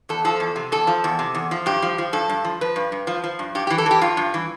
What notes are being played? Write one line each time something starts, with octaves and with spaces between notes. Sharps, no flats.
E2 A4
F3 A4
E2
C3
E2 A4
F3
E2
C3
E2
F3
G2 G4
F3
F3
G2 A4
G2
F3
F3 B4
G2
G2
F3
F3
G2
G2 G4
G4
E3
A4
E3 G4
G2 F4
G2
E3